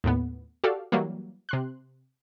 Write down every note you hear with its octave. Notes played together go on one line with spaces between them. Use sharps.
D#2 A2 B3
F#4 G4 A4 D5 F5
E3 F#3 G3 A#3
C3 C6 F#6